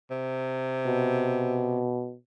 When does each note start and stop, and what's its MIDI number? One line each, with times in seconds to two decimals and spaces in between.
0.10 1.81 48
0.86 2.15 47